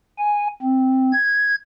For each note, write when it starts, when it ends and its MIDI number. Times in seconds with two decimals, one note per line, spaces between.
0.18 0.47 80
0.62 1.12 60
1.13 1.55 92